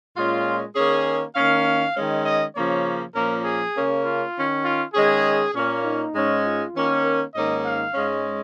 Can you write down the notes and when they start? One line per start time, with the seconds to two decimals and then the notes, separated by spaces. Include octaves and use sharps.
0.16 A#2 G#3 C#4 F4
0.75 D#3 A#3 C#4 G#4
1.35 D#3 A#3 C#4 F5
1.95 D#3 G#3 C#4
2.25 D#5
2.55 C#3 F3 A#3 C#4 C#5
3.14 A#2 F3 A#3 C#4 A#4
3.45 G#4
3.75 C#3 A#3 C#4
4.05 F4
4.35 D#3 C#4
4.65 F4
4.94 D#3 G#3 C#4 G#4
5.55 A#2 A#3 C#4
5.84 D#4
6.15 G#2 G#3 C#4
6.44 F4
6.74 D#3 A#3 C#4
7.04 A#4
7.35 G#2 D#3 A#3 C#4 D#5
7.64 F5
7.94 G#2 G#3 C#4